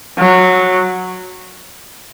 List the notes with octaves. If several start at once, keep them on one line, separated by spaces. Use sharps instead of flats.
F#3